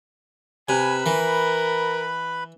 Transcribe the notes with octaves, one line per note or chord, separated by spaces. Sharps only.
C3 B4 G#5 B5
E3 A#4